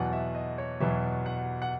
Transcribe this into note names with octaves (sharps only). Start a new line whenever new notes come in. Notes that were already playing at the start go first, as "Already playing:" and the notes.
Already playing: E2 B2 F#3 F#5
E5
D#5
C#5
E2 B2 F#3 E5
F#5
F#5